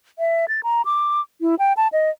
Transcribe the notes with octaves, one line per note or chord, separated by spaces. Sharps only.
E5
A6
A#5
D6
E4
G5
A5
D#5